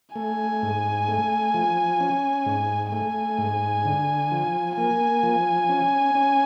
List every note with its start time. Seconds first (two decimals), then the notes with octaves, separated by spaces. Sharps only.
0.16 A3 G#5
0.63 G#2
1.09 A3
1.54 F3
2.00 C#4
2.46 G#2
2.92 A3 G#5
3.38 G#2
3.85 D3
4.32 F3
4.77 A#3 G#5
5.23 F3
5.69 C#4
6.15 C#4